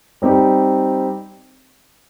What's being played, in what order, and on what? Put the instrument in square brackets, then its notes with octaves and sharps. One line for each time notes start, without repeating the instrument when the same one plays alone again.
[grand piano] G3 C4 D#4 G4